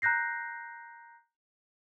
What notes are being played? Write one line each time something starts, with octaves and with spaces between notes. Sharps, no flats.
A#5 F#6 G6 A#6 C7